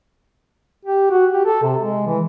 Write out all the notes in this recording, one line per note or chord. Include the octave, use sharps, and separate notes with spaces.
G4
F#4
G4
A4
C3
G#3
E3